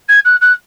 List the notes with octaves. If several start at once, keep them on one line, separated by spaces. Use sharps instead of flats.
G#6
F#6
F#6